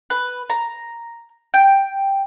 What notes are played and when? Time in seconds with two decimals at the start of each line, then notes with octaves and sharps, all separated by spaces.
0.10 B4
0.50 A#5
1.54 G5